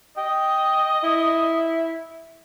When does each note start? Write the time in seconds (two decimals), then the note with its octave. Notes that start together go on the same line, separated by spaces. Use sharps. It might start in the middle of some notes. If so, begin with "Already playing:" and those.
0.17 D#5 G5
1.03 E4